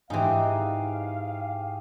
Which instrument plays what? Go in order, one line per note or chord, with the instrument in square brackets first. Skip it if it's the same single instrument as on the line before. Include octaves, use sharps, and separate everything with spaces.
[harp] G#2 C4 [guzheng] E3 D#4 [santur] G4 G#4 [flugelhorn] F5